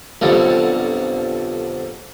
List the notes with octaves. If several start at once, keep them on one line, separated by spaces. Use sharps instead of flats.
B1 F2 D3 G3 D4